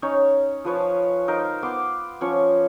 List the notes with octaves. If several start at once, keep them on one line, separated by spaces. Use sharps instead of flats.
C#4 D#4 C#5
F3 B4 C#5 A5
D#4 A#4 C5 F5
B3 C6 D6
F3 C#4 C#5 C#6